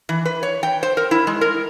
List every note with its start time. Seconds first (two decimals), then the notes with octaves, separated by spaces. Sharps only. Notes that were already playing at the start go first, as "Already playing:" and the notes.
0.09 E3
0.26 B4
0.43 C#5
0.63 G5
0.83 C5
0.97 A#4
1.11 E4
1.27 G#3
1.41 A#4